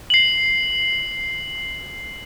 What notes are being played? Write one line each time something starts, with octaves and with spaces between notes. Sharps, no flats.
C7 F#7